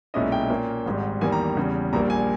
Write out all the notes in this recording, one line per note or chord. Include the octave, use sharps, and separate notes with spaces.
B1 A#2 G#3 C#4 E4 D#5
G5
A#2 A#3 C#4
G#1 G#2 G3
E2 D#3 G3 A#3 G#5
A#5
E2 C#3 G3
A#1 A#2 G3 A#3 A#5
G#5